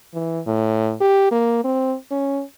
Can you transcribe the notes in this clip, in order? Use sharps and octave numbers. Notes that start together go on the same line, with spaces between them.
E3
A2
G4
A#3
C4
C#4